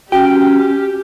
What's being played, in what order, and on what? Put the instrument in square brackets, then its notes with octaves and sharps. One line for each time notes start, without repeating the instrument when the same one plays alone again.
[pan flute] C#4 [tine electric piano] F#4 [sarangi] G4 [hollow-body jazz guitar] G5